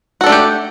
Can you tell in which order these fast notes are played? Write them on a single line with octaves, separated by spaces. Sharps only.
F#4 A4 D4 A3 G4